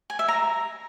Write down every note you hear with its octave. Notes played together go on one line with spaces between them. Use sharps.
G#5
E5
A#5